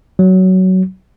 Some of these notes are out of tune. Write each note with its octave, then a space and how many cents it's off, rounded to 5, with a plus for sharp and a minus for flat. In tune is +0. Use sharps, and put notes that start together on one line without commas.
F#3 +15